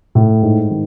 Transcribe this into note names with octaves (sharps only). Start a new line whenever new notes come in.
A2
G#2
D#3